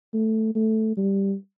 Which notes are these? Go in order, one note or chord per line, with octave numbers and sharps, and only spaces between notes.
A3
A3
G3